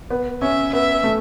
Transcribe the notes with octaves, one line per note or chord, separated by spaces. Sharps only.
B3
C#4 E5
B3 E5
A3